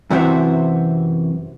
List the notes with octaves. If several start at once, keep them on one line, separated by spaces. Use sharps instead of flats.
F#2 C3 E3 F#4 C5 E5